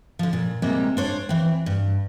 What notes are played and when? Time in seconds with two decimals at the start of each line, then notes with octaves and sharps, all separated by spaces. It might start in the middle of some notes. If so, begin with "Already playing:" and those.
0.19 D3 F3
0.33 A#2
0.62 C3 G3 G#3 A#3
0.97 D4 C5 C#5
1.29 E3 C4
1.66 G2